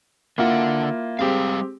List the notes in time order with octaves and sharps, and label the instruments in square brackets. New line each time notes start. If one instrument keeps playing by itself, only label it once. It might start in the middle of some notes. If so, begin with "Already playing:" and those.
[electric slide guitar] D3 F#5 [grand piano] A#3 E4 F4
[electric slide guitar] G3 G#4 F5 [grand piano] G#3 C4 G4